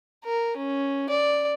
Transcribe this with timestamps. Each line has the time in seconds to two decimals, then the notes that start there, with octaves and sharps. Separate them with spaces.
0.24 A#4
0.57 C#4
1.09 D5